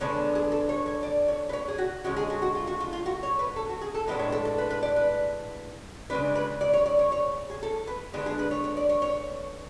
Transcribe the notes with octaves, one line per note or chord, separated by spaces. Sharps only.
D3 G#3 B3 D4 C#5
G#4
A4
C#5
C#5
D5
C#5
B4
C#5
G#4
F#4
D3 G#3 C#4 F#4
G#4
F#4
F#4
F4
F#4
F4
F4
F#4
C#5
B4
A4
F#4
G#4
A4
A2 G#3 B3 D4 B4
C#5
A4
A4
B4
B4
D5
B4
C#3 G#3 D4 B4
B4
D5
C#5
D5
C#5
C#5
G#4
A4
B4
D3 G#3 B3 D4 G#4
G#4
B4
C#5
C#5
D5
C#5
C#5